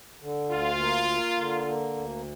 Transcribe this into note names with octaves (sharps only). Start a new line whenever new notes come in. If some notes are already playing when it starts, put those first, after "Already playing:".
D3
D2 F4
A#3
A#3
D3
A#3
D2